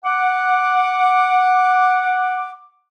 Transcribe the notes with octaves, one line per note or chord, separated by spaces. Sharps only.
F#5 D6